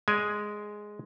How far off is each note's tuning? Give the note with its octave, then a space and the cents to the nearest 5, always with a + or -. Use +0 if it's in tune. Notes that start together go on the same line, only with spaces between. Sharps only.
G#3 +0 D5 -20 G#5 +0